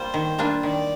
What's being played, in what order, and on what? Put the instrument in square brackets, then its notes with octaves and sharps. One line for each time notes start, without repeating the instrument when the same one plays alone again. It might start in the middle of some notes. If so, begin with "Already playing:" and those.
Already playing: [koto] G3 A#3 F4 [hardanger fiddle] C5
[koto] D#3
G3 A#3 D4 F4
[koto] D#3 [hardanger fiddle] D5